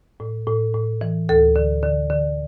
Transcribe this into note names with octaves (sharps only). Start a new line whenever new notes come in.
A2
A2
A2
E3
D2 A4
D3
D3
D3